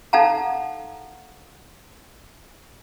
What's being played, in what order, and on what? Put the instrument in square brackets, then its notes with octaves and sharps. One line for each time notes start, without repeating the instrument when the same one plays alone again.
[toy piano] D#4 A4 F5 F#5 A5 A#5